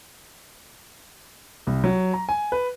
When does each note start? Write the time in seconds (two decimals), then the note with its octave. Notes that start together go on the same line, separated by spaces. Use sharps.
1.67 C2
1.84 F#3
2.14 A#5
2.29 G#5
2.52 B4